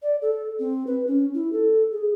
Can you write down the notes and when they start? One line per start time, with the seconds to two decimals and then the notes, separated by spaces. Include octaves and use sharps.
0.03 D5
0.22 A4
0.59 C4
0.87 B4
1.07 C#4
1.34 E4
1.52 A4
1.92 G#4